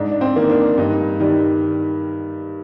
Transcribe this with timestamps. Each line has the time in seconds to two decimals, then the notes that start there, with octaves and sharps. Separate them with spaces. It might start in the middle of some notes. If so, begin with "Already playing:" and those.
Already playing: G#2 D4
0.11 D4
0.21 C4
0.36 D#3 A#3
0.50 D4
0.78 G2 D#4
1.20 D#3 G3